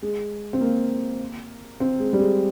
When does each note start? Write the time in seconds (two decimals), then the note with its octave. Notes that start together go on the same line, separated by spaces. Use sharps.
0.02 G#3
0.53 C4
0.61 A#3
1.80 C4
2.00 G#3
2.13 G3
2.19 G#3